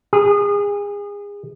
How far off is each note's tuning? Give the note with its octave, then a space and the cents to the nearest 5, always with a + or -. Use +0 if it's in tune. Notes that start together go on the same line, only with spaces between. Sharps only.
G#4 -30